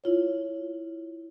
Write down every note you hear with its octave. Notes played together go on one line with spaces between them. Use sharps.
E4 F4 C#5